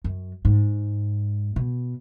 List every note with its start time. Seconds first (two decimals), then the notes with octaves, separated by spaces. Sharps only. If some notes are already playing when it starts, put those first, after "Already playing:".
0.04 F#2
0.45 G#2
1.56 B2